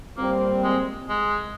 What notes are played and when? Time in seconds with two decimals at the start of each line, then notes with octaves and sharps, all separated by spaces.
0.17 A#2 G3 A#3 C4
0.63 G#3
1.09 G#3